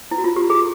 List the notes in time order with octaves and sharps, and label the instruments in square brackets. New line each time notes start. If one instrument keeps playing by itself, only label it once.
[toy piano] E4
F#4
F4
G4
G#4